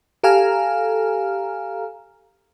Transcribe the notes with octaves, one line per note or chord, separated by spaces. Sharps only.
G4 A4 F5 G#5 A#5 F6